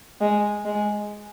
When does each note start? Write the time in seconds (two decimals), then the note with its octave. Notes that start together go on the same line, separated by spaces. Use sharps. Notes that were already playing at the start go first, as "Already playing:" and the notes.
0.21 G#3
0.65 G#3